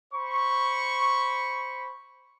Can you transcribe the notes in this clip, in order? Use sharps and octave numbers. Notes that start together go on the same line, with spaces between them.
C5 B5 C#6